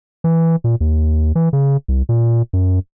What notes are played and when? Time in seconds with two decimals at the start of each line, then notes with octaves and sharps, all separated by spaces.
0.24 E3
0.64 A#2
0.81 D#2
1.35 E3
1.53 C#3
1.88 C2
2.09 A#2
2.53 F#2